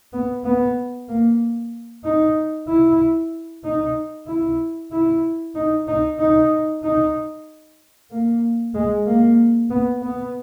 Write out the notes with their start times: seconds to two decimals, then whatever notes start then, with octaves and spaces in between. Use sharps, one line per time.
0.13 B3
0.45 B3
1.09 A#3
2.04 D#4
2.68 E4
3.64 D#4
4.28 E4
4.92 E4
5.55 D#4
5.88 D#4
6.19 D#4
6.83 D#4
8.11 A#3
8.75 G#3
9.06 A#3
9.70 B3
10.02 B3